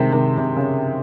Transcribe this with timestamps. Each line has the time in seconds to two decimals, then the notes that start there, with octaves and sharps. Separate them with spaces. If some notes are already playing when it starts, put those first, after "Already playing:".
Already playing: C3 D#3 G#3 C4
0.13 C3 D#3
0.38 C3
0.56 C#3